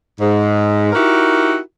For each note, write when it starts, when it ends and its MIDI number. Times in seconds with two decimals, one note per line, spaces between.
0.19 0.91 44
0.92 1.58 63
0.92 1.58 64
0.92 1.58 66
0.92 1.58 67
0.92 1.58 70